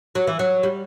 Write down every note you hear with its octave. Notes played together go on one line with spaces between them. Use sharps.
F#3
E3
F#3
G3